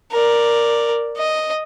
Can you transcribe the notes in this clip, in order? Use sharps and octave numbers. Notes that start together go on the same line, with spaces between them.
A#4 D5
D#5